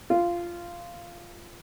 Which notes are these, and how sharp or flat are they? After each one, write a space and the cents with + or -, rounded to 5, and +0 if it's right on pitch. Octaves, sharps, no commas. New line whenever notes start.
F4 -10